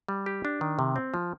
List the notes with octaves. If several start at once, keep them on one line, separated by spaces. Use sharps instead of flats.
G3
G4
D4
D#3
C3
C4
F3